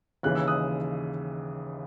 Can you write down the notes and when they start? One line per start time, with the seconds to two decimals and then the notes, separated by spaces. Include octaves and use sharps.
0.23 D#2 C#3 E3 F#6
0.35 E6
0.48 D#6 F#6